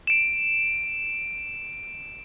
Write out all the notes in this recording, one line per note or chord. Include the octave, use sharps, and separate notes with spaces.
D7 E7